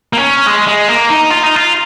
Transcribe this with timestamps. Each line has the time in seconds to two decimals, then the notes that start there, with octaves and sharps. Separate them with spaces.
0.13 A#3
0.18 C#4
0.46 G#3
0.67 G#3
0.88 A#3
1.10 D#4
1.30 F4
1.43 D#4
1.56 F4